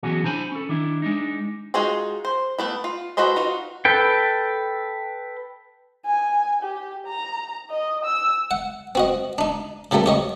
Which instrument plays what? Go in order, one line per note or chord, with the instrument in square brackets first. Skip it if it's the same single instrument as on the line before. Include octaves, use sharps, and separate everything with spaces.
[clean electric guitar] B2 E3 F#3 C#4 F#4 G#4
D4 E4 C5 G#5 A5 B5
C#4 A4
D#3 D4 E4
G#3 D4 D#4
[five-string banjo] G#3 D#4 F4 F#4 G#4
C5
A3 B3 E4
F4
F#4 A4 B4 C5 D#5
D#4 F4 F#4
[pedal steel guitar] A4 B4 G5
[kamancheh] G#5
G4
A#5
D#5
E6
[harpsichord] F#5
C4 F#4 D#5
D4 D#4
C#3 F#3 G3 A3 A#3
G4 C#5 D#5